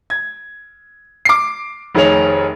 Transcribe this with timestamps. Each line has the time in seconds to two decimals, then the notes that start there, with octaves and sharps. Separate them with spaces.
0.10 G#6
1.25 D6 C7
1.95 F1 D#3 G#4 C#5 F7